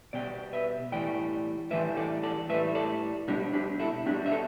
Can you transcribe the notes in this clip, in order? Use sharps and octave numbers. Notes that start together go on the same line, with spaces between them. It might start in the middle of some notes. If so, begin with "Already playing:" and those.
B2 G3 D5 G5
B4 E5
A2 E3 G3 D5 G5
A2 E3 G3 B4 E5
A4 D5
A4 D5
A2 G3 B4 E5
A4 D5
B2 G3 D4 G4
D4 G4
E4 A4
B2 D4 G4
G3
E5
A4